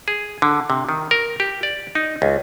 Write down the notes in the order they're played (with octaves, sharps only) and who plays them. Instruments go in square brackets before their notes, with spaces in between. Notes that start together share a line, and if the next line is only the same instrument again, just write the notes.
[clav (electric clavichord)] G#4
D3
C3
D#3
A#4
G4
D5
D#4
C#2